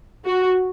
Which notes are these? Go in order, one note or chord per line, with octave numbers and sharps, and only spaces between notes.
F#4